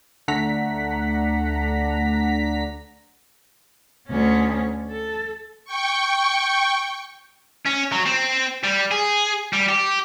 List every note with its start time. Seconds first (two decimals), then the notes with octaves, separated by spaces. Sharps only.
0.28 D2 A3 D4 F#5 A#5 B6
4.09 D2 C#4
4.90 A4
5.65 G5 C#6
7.66 C#4
7.92 F#3
8.06 C4
8.64 G3
8.91 G#4
9.53 G3
9.69 G4